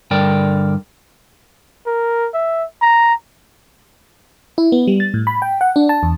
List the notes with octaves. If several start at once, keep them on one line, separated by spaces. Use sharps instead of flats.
G2 D3 A#4 D5 G5
A#4
E5
A#5
E4
B3
G3
A6
A2
B5
G5
F#5
D4
A5
E2